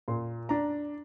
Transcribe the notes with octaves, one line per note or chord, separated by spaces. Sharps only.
A#2 C6
D4 A#5